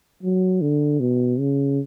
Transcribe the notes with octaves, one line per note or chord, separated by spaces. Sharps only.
F#3
D3
B2
C#3